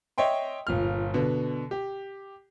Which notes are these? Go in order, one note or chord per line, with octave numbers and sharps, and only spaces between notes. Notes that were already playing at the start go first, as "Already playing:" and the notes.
C#5 D#5 E5 G5 C6
G1 A#2 F6
B2 D3
G4